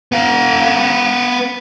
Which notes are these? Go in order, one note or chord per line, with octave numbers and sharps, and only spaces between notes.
B3 F5